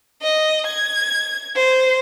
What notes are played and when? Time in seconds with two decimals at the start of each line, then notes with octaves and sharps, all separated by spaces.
0.22 D#5
0.67 G#6
1.56 C5